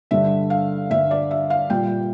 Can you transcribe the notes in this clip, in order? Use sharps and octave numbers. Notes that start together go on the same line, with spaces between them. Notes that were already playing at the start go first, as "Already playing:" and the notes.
G2 D3 G3 E5
F5
G2 D3 G3 E5
D5
E5
F5
A#2 G3 G5